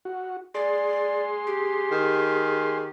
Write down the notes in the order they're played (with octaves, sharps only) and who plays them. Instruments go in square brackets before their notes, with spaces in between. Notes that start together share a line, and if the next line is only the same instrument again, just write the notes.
[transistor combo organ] F#4
[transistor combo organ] G#4 C6 [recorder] D5
[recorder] G4
[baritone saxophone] D#3